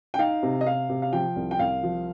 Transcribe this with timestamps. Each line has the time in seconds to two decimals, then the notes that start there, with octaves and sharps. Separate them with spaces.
0.14 G5
0.19 D#4 F5
0.43 C3
0.61 D#5
0.66 C3 F5
0.89 C3
1.02 F5
1.13 F3 G5
1.36 C2
1.51 G5
1.59 C2 F5
1.83 F3